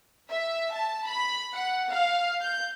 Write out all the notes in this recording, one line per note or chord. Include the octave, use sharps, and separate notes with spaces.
E5
A5
B5
F#5
F5
G6